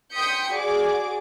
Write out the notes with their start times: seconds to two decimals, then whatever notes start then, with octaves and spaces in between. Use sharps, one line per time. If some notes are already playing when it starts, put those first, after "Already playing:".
0.14 G5 C6 D#6 G6 B6 C#7
0.52 F#4 G#4 D5 D6